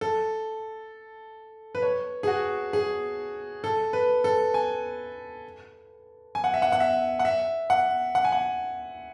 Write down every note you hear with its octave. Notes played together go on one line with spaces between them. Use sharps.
A4
B4
C#5
G#4
F#4
G#4
A4
B4
A4
G#5
G#5
F#5
E5
F#5
F#5
E5
F#5
E5
F#5
F#5
G#5
F#5